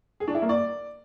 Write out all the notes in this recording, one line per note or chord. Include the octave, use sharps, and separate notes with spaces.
G#4
D4
E4
A#3
D5